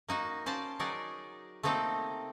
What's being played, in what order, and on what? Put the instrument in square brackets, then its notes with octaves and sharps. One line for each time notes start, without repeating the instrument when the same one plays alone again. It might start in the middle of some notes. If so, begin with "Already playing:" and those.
[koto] A#3 D#4 F#4
C#4 C5 D5 F5 A5
F#3 D#4 G#4 A#4 D5
A3 A#3 C4 D#4 G4 A4